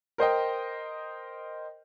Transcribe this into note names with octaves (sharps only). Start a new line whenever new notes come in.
A#4 C5 D#5 G5